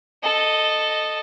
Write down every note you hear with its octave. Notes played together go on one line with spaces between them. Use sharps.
A4 D#5